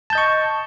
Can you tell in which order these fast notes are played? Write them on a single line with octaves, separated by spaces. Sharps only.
A5 G6 D#5 C#6